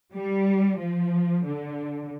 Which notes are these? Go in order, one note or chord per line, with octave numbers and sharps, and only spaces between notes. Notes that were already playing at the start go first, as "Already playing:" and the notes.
G3
F3
D3